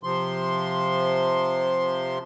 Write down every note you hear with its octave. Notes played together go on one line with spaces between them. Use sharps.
C3 F3 C6